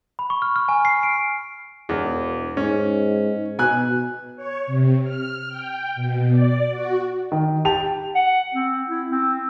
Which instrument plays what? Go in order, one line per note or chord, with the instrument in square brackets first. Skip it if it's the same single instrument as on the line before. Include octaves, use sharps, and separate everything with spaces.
[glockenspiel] B5
C#6
F6
F6
G#5
C7
D7
[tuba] E1 [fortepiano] E2
[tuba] G#2 [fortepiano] C#4
[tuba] B2 [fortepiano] G#5 F#6
[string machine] C#5
C3
F6
G5
B2
D5
F#4
[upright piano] D#3
G4 A5 F7
[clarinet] F#5
C4
E4
C4